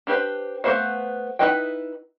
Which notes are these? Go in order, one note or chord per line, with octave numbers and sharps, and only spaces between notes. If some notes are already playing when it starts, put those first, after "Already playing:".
D4 G4 B4 C5
A3 B3 F#4 C5 F5
D#4 E4 B4 D#5 G5